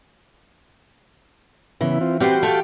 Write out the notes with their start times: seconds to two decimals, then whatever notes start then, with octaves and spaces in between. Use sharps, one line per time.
1.81 C#3 E3 B3 E4
2.01 C4 F4
2.20 G3 B3 C4 F#4 C5 G5
2.43 A3 F4 G4